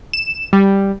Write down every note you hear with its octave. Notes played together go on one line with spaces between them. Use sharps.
E7
G3